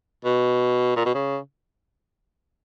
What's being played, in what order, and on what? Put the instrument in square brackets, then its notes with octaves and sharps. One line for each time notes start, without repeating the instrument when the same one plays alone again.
[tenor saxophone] B2
A#2
B2
C#3